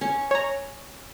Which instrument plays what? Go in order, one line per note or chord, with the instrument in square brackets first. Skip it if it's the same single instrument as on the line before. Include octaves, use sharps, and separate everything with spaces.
[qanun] C#4
[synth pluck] C#5 A#5